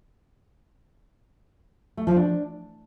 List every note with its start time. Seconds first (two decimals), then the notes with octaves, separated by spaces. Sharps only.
1.97 A3
2.07 F3
2.16 D4